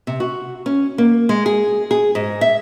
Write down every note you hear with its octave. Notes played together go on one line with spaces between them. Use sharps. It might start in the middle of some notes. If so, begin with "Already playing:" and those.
C3
F#4
C#4
A#3
G#3
G#4
G#4
G#2
E5